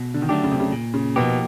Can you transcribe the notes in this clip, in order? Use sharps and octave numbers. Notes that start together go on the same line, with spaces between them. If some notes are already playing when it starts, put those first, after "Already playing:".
Already playing: B2
D3
D#3
D3 F#3 A3 D4 G4
C#3
C3
C#3
A#2
C#3
B2 F3 A#3 D#4 G4